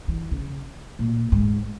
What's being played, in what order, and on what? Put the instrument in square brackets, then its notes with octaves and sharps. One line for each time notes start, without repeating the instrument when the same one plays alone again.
[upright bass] E3
C#3
A#2
G#2